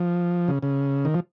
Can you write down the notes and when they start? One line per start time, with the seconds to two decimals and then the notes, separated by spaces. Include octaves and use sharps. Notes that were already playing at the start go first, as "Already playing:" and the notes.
Already playing: F3
0.48 C#3
0.63 C#3
1.05 D#3
1.14 F3